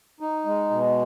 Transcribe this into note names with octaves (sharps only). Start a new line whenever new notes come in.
D#4
G#3
B2